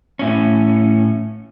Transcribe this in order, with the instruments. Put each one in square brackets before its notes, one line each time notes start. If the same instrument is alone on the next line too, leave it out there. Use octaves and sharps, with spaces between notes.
[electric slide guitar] A2 C#4